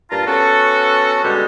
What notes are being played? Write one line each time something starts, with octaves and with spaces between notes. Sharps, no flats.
G2 A#2 F4 A5 A#5
B3 C#4 F#4 A4
B2 D3 G3 G#3